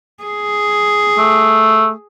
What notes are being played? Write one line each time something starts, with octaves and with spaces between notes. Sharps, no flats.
G#4
A3